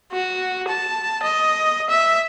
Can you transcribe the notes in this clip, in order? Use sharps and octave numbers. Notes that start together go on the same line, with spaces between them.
F#4
A5
D#5
E5